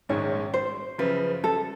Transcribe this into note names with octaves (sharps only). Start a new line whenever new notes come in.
A#1 G#2 D#3 G#3 C#4 C#5
C5
F#2 C#3 F3 B4
A4